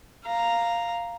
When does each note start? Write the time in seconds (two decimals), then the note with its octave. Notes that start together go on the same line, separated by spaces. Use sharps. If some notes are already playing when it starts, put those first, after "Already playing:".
0.24 F5 A#5